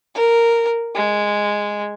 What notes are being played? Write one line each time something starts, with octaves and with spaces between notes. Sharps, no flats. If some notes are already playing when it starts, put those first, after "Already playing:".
A#4
G#3